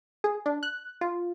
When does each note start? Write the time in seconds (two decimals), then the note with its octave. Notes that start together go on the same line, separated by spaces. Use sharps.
0.24 G#4
0.46 D4
0.63 F#6
1.01 F4